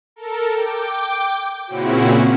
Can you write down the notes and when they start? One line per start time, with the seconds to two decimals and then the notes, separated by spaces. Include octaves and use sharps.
0.16 A4 A#4
0.53 G5 D6
1.67 A#2 C#3 C4 C#4 E4 F#4